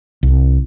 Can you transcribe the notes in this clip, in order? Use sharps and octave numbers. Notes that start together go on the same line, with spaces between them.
C2